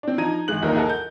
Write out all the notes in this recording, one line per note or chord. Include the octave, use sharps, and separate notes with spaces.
C4 D4
F3 D#4 A#5 G#6 D#7
G#1 E3 G#3 F#6 F#7
A#1 D#2 G3 D#4 A#4 D#5
A4 A#4 D#5 F#5 G#5
G6